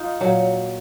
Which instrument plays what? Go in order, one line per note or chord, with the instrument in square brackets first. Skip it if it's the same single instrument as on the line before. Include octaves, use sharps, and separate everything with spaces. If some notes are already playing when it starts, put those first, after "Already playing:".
Already playing: [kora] D#4 F4
A#2 F#3